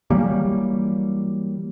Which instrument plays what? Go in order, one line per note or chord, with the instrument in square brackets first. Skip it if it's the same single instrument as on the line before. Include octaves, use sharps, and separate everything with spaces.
[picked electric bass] E3 F#3 G3 A#3